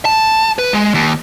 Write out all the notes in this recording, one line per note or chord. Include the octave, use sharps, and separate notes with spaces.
A5
B4
G#3
D#2